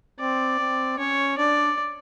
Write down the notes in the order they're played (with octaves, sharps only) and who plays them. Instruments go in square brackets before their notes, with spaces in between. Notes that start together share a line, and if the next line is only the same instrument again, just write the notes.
[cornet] C4 [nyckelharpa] D5
[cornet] C4
[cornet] C#4 [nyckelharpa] C#5
[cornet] D4 [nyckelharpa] D5